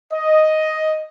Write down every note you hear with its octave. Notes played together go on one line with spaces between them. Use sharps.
D#5